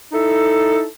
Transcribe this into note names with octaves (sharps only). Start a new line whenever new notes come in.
D#4 E4 A4